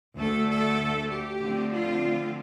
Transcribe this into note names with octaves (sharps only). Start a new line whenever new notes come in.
D2 D3 A3 A4
A4
G4
D3 F3 A3 C4
F4